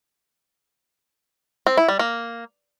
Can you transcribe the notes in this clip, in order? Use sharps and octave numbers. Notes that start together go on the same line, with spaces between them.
C4
E4
G3
A#3